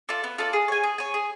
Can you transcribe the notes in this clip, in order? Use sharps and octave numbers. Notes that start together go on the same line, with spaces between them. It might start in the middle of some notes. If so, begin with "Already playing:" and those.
F4 A4 D5
B3
F4 A4 D5
G#4
C#5 G#5
G#4
C#5 G#5
G#4